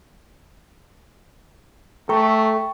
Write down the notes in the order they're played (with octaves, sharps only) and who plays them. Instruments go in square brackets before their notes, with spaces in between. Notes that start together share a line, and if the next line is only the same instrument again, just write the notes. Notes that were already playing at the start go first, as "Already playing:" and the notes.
[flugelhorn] A3 [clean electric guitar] A4 A#5 [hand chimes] G5 C#6